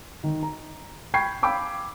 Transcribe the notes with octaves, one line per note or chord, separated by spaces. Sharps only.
D#3
A#5
G5 B5 C#6 G#6 C7
F5 G5 B5 D6 E6